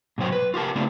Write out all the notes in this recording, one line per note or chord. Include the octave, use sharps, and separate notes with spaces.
G#2 B2 F#3 C5 G5
B4
F4 G4 A#4 A5
C#3 A3 C4 D4 E4 F4